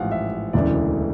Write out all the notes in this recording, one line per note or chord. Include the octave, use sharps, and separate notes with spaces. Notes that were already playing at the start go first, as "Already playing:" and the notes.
Already playing: A1 G#2 F3 F5 F#5
E5
E1 D2 C#3 E3 D5